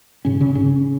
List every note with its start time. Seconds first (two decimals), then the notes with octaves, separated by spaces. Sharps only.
0.25 G#2 C#3 C#4
0.40 C#3 C#4
0.55 G#2 C#3 C#4